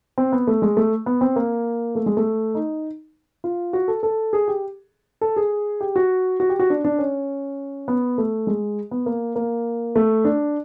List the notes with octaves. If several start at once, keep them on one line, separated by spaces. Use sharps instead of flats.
C4
B3
A3
G#3
A3
B3
C4
A#3
A3
G#3
A3
D#4
F4
F#4
A4
A4
G#4
G4
A4
G#4
G4
F#4
F#4
G4
F#4
D4
D4
C#4
B3
A3
G#3
B3
A#3
A#3
A3
D4